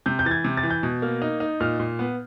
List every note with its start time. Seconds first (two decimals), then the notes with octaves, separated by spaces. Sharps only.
0.06 C3 G6
0.19 G6
0.25 E3 A6
0.31 G#6
0.44 C3
0.57 A6
0.63 E3
0.70 G6
0.83 B2
1.02 A#3
1.22 D#4
1.40 D#4
1.60 A#2 F6
1.80 A#2
1.99 B3